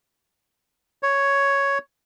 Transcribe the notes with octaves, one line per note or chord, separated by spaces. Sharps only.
C#5